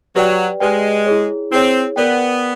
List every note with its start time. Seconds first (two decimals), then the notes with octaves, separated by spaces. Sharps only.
0.15 F#3 G4 B4 D5 G5
0.60 G#3 G4 B4 D5 G5
1.06 E4 G#4 C#5
1.51 C4 E4 G#4 C#5
1.96 B3 A#4 D5 G5